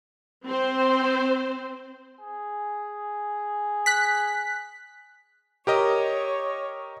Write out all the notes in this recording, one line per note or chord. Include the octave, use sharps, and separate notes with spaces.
C4 C5
G#4
F#6 B6
G4 A#4 C#5 D#5